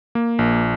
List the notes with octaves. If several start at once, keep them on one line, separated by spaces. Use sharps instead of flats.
A#3
A#1